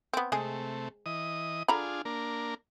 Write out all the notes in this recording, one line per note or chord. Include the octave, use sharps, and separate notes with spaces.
B3 C4
C3 G#3 A3 C4 G#4
E3 D#5 D#6
D3 D4 F4 G#4 A#5 B5
A#3 D4 A#4